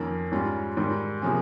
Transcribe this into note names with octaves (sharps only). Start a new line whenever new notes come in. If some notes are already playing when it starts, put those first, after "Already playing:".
Already playing: F2 D#3 A#3 C#4
G#2 G3 C#4 F4
G#2 D#3 G3
C3 F3 A#3 C#4 G#4